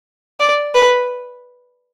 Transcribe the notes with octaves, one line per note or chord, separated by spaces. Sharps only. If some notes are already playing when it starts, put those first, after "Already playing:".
D5
B4